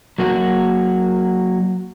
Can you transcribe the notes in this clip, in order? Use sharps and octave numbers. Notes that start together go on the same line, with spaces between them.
F#3 A#3 F#4